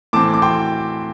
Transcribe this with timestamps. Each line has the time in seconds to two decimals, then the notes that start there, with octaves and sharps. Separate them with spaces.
0.13 A2 E3 C4 A5 D6
0.34 D6
0.42 G5 C6